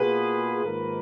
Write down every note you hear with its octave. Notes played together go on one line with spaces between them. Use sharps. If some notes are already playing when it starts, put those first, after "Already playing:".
Already playing: B2 A#3 F4 G#4 B4
G#2 D#3 A#3 F4 A#4